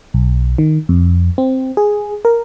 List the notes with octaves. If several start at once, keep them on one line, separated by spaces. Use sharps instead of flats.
B1
D#3
F2
C4
G#4
A#4